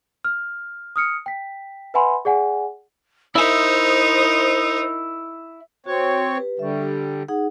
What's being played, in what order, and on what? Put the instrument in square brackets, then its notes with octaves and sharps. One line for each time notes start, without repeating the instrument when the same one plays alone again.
[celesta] F6
D#6 F6 C#7
G5 B6
B4 E5 F#5 G#5 B5 C6
G#4 D5 F#5 G#5
[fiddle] D#4 A#4 [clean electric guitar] E4 D5 E5 [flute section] C5 D#6
[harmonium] C4 C#5 [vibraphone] F#4
[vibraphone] G4 B4
[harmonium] D3 G3 [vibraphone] E5 C#6
[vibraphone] G4
D#4 G#4 F#5